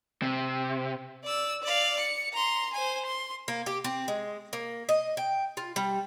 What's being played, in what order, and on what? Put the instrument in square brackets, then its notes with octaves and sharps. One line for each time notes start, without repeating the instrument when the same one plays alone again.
[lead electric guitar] C3
[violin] D5 E6
D5 F5
C#7
A#5 C6
C5 G#5
C6
[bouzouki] A#3
G4
C4
G#3
A#3
D#5
G5
F4
G3